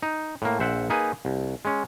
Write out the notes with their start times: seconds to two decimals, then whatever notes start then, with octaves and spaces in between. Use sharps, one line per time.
0.03 D#4
0.42 A2 A#3
0.60 A#1 C5 E5 F#5
0.90 A#3 D#4 G#4 B4
1.25 C2
1.65 G#3 C#4